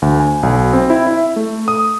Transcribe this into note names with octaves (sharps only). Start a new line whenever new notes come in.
D2
G#5
B1
C4
E4
E5
A3
D#6